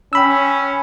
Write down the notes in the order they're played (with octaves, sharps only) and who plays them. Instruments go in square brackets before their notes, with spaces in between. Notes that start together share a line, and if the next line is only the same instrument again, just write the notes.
[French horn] C#4 [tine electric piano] G5 B5 E6